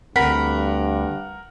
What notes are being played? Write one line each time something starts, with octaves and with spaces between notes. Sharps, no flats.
D2 G2 C4 A#4 F#5 B5